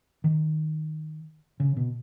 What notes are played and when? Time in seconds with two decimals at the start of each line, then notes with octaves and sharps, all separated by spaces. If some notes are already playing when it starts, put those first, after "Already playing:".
0.24 D#3
1.60 C#3
1.77 B2